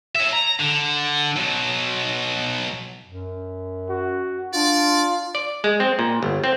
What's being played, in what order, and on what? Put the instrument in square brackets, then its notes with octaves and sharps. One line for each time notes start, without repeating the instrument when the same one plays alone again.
[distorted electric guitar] C#5 E5
A#5
D3
B2 F#3
[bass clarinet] F#2
[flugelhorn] F#4
[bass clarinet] D4 [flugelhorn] F4 [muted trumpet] D5
[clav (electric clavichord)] D5
G#3
C4
A#2
G1
C4